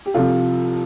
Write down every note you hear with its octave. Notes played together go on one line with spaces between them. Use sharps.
G4
C2 C3 F3 F4 A4